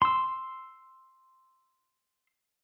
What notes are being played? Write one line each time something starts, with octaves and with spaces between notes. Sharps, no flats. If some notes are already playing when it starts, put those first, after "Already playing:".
C6 E6